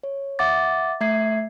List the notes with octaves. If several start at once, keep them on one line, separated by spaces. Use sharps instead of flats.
C#5
E5 F#5 D6 A6
A3 E5 G#6 C7